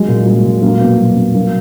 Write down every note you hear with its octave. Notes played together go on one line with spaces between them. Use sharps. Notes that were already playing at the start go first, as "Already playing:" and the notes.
Already playing: F#3 G#3
A#2
F#3
A#2
F#3 A#3
B2
F#3
B2
F#3 A#3